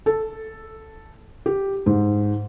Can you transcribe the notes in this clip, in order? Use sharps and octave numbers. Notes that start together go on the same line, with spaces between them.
A4
G4
G#2